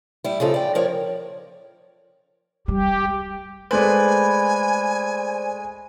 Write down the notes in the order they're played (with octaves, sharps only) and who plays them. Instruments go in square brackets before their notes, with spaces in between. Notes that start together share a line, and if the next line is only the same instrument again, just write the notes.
[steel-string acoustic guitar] G3 E4
C#3 F3 D#4 A4
D5 G5
F3 A#4 C#5 D5
[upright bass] G3 [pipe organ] G4
[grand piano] G#3 A3 [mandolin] B4 [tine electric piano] C5 D5 [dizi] G#5